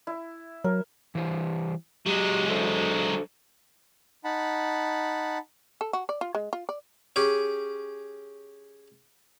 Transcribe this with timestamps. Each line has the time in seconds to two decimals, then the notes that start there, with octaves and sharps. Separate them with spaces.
0.07 E4
0.64 F#3 A#4
1.15 E3 G3 C5
2.06 F#3 G#3 G4
2.50 D4 A4 C5
4.24 D#4 F#5 A5 B5
5.81 A4
5.93 F#4
6.09 D5
6.21 F4
6.35 G#3
6.53 F4
6.69 D5
7.16 C#4 G4 G#4